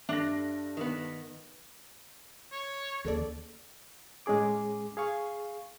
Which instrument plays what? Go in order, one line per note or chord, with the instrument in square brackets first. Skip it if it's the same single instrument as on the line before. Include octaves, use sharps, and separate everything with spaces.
[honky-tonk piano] G2 A4 A#6 [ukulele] D4 [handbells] E5
[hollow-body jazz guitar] D#3 B3
[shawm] C#5
[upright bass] D#2 [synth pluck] C#3 A4 D5
[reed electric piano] A2 G#3 C#4 G#4 D6
G#4 F5 C#6